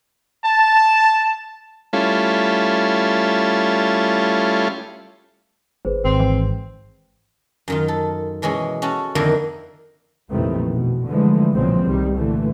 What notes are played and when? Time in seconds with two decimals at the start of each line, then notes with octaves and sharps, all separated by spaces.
0.45 A5
1.93 G3 A3 C#4 E4 F4 A4
5.85 G1 G#4 B4 C5
6.05 G#1 C4
6.20 E3
7.68 F#2 D#3 F4
7.88 A4
8.42 B2 E3 G#3 C#4 G#4
8.82 C#4 F#4 A4
9.15 F2 D3 D#3 A#3 E4
10.30 A#1 F2 C3 D#3 E3 A3
10.72 B2
11.06 D3 E3 F3 G#3 A3
11.54 B1 A#2 C#3 F3 G#3 C4
11.84 C2 G2 D#3 G3
12.16 A#2 D3 E3 A3